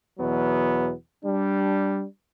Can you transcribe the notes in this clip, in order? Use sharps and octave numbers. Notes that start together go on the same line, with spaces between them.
E2 B2 F#3 B3
G3 D4